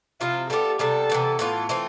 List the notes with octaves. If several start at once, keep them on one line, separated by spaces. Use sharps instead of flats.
C3 F3 C4 E4 F4
G3 B3 D4 G4 A4
C3 G3 B3 A4
C3 E3 B3
A2 E3 B3 F4
E3 A3 C4 F4